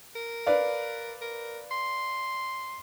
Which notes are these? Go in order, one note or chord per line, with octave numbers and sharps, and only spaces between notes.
A#4
B4 D5 F5
A#4
C6